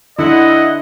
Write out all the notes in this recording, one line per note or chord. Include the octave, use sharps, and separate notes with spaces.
D3 E4 D#5 F#5